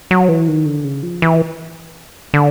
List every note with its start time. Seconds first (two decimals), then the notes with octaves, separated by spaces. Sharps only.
0.11 F#3
0.29 E3
0.48 D#3
0.65 D3
0.84 C#3
1.03 F3
1.22 E3
2.34 D3